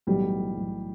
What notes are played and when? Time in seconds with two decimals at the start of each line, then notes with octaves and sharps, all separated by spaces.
0.07 B1 A2 E3 G3
0.57 B1 A2 E3